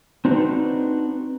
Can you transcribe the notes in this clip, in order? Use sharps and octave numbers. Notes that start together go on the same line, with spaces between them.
C4 D4 D#4 F#4 B4